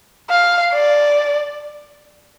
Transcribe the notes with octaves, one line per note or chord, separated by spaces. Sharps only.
F5
D5